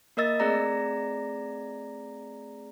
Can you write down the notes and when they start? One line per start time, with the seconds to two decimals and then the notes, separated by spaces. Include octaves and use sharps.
0.17 A#3 A#4 D#5 E6 A6
0.39 A3 C4 G#4 D5 A#5 A#6